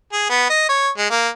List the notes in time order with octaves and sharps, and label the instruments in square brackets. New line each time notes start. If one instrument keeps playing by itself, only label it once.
[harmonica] G#4
B3
D#5
C#5
G#3
A#3